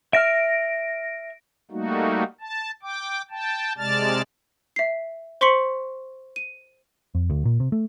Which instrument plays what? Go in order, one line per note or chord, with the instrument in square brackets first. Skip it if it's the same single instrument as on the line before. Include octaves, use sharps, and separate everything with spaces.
[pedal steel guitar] E5 F6 [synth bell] A#6 D7
[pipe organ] G3 A3 A#3 D#4 F#4
A5
G5 D6
G5 A5
C3 G#3 D5 A5 F6 A6
[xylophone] E5 C7
C5 C6 C#6 B6 C#7 F#7
D#7
[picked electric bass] F2
D2
A#2
C3
A3